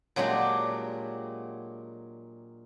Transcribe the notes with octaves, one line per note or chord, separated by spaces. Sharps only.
A#2 F#3 G#3 D4 G4